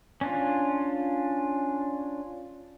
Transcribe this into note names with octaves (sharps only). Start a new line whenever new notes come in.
C#4 D4 F4